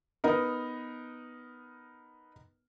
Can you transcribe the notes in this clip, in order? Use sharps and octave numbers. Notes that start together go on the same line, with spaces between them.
B3 D#4 A#4